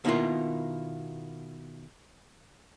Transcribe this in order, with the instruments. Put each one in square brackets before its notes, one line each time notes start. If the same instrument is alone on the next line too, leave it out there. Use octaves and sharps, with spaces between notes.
[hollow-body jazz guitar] B2 D#3 A#3 E4 F4